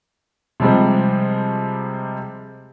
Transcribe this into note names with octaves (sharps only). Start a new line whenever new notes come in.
C3 F3 G3 G#3 C4